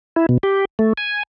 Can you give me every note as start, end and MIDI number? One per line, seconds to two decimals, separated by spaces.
0.16 0.26 64
0.29 0.38 47
0.43 0.65 67
0.79 0.93 57
0.98 1.23 80